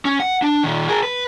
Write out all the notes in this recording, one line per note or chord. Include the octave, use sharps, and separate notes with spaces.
C#4
F#5
D4
A#2 D#3
G#4 A#4
B4